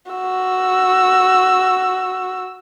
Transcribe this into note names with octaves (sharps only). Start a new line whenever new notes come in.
F#4 E6